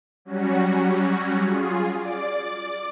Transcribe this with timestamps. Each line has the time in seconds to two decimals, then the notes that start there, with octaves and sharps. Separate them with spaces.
0.25 F#3 G3 C#4 F#4
1.44 F4 G#4
1.98 D5 D6